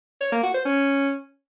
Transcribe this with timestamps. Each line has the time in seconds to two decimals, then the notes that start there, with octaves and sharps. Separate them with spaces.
0.21 C#5
0.32 A#3
0.43 F#4
0.54 C5
0.65 C#4